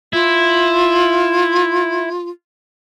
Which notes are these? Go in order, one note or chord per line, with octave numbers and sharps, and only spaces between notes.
E4 F4